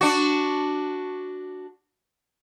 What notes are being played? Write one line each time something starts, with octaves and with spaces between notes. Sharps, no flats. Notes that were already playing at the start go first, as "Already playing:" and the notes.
D4 F#4